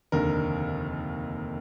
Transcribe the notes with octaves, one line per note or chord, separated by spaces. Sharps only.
F1 D#2 D3 A#4